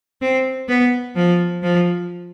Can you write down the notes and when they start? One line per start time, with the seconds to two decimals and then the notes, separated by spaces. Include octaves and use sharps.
0.22 C4
0.69 B3
1.16 F3
1.63 F3